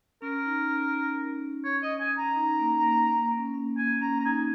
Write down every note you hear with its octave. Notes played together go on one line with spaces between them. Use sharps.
C#4 A#4
D#4
C#4
C#5
D#5
G#5
A#5
D#4
A#3
A#3
A#3
A#3
C#4
A#3
C#4
A#3 G#5
A#3
C#4 A#5
A#5
D#4 G#5